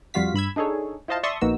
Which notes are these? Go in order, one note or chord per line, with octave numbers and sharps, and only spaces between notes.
F2 G3 F4 F#4 F5 B6
G2 B5 E6 G#6
D4 D#4 G#4 A4 C#5
E4 F4 C5 D#5 F5 A5
D5 E5 A5 C6 C#6 D#6
A#1 A#3 B3 D#4 F#4 E6